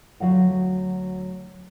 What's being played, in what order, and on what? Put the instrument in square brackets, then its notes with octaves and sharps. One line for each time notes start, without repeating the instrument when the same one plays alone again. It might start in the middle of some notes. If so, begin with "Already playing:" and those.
[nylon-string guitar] D2 C#3 F#3 F5 F#5